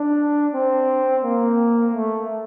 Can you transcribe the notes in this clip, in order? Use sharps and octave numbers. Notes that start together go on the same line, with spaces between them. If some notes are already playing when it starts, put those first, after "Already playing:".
Already playing: D4
C4
A#3
A3